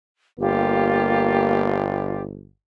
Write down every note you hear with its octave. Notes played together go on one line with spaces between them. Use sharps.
G1 A#3 F4 G4